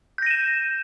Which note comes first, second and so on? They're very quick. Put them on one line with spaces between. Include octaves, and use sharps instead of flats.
G6 A#6 D#7 E7